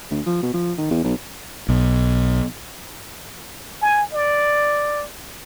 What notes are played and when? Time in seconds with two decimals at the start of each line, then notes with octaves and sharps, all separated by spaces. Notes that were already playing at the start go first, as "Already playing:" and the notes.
0.11 D2
0.26 F3
0.42 B2
0.54 F3
0.78 D#3
0.91 E2
1.04 B1
1.69 B1
3.82 G#5
4.13 D5